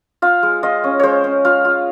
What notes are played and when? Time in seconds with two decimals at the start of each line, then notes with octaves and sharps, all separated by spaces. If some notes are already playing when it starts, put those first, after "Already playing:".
0.22 F4 F5
0.43 G#3
0.63 F4 D#5
0.84 C#4
0.99 G#3 C5 C#5
1.24 C#4
1.45 F4 F5
1.65 F4